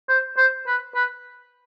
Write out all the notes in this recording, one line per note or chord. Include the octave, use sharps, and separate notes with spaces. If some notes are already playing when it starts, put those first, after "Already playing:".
C5
C5
B4
B4